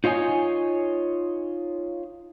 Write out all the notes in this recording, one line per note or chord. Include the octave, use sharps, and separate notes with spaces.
D#4 F4 C#5 D#5 G#5